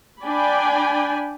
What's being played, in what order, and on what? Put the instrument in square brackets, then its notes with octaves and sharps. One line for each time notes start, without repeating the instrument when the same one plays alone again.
[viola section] D4 D5 G5 G#5 B5